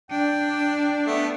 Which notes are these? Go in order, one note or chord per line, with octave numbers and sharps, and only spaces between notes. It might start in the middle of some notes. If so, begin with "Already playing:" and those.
D4 G5
A3 B3